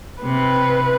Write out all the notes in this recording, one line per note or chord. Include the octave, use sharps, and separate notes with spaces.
C3 B4